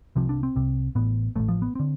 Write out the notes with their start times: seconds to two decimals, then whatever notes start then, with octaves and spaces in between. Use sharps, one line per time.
0.16 C2 C3 F3
0.29 D4
0.43 C4
0.56 C2 C3
0.95 A1 A2 B3
1.36 A1 A2 A3
1.49 F3
1.62 B3
1.75 D3 C4